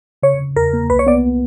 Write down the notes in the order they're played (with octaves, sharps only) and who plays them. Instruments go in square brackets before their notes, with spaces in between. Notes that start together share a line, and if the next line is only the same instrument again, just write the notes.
[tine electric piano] C#3 [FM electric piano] C#5
[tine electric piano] C#3
[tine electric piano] E2 [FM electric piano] A#4
[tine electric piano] A#3
[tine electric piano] C2 [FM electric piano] B4
[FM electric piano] C#5
[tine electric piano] B3 [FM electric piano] D5